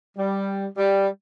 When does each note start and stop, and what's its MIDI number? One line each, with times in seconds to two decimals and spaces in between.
0.18 0.66 55
0.77 1.08 55